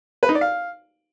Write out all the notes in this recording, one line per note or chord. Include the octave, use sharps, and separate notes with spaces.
B4
D#4
D5
F5